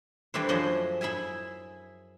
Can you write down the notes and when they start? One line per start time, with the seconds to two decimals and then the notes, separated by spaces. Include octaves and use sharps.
0.34 E3 G3 A3 D4 A4 C5
0.49 F#2 F3 G#4 C5 D#5 E5
1.01 E4 G#4 E5 G#5